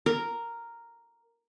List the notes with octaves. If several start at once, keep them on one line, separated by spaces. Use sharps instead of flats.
A#4